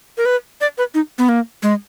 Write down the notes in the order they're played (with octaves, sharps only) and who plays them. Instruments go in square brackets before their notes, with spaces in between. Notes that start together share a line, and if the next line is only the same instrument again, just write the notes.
[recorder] A#4
B4
D5
B4
D#4
B3
A#3
G#3